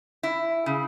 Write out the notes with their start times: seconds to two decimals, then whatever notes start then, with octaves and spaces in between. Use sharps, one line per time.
0.23 E4
0.66 C#3